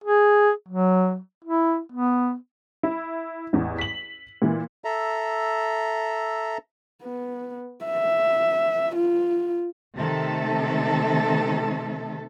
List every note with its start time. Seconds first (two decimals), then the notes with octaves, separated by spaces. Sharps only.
0.04 G#4
0.68 F#3
1.45 E4
1.92 B3
2.83 E4
3.53 A1 E2
3.78 B6 F#7
4.42 A#2 E3
4.84 A4 E5 A#5
7.03 B3
7.85 E5
8.96 F4
9.95 C3 D#3 A3 A4 E5